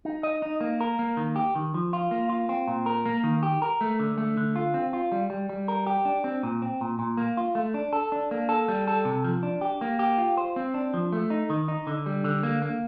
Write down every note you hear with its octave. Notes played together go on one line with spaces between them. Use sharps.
D#4
D#5
D#4
A#3
A#4
A#3
D#3
G4
D#3
F3
F4
A#3
F4
C4
A#2
A#4
A#3
D#3
G4
A#4
A3
D3
A3
D3
F4
C4
F4
G3
G3
G3
A#4
G4
D4
C4
A#2
C4
A#2
A#2
A#3
F4
A3
D4
A4
D4
A#3
A4
G3
A4
C3
F3
D4
G4
A#3
G4
F4
C5
C4
D4
F3
A3
D#4
D#3
D#4
D3
G3
D3
A#3
A#3